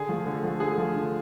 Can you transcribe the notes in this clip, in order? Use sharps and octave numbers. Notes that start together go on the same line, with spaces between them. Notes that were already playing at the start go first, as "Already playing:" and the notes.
Already playing: D3 G#4
F3 A3
D3
F3 A3
D3 G#4
F3 A3
D3